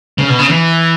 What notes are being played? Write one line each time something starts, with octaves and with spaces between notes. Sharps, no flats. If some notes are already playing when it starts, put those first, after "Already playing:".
C#3
B2
C#3
E3